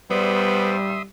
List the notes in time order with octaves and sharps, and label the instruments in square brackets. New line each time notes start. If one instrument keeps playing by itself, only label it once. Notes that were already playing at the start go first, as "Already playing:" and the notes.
[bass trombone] G3 [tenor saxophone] B3 [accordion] C5 D5 D6 [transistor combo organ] E5 C6 D#6